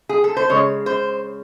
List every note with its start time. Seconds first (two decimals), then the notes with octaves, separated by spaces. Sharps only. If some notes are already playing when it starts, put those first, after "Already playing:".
0.09 G#4
0.24 A4
0.37 C5
0.49 C#3 G#3 C#5
0.86 C5